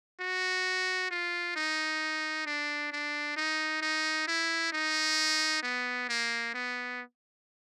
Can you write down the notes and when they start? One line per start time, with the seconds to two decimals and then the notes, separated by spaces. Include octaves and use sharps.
0.20 F#4
1.11 F4
1.56 D#4
2.46 D4
2.92 D4
3.37 D#4
3.82 D#4
4.28 E4
4.72 D#4
5.63 B3
6.09 A#3
6.54 B3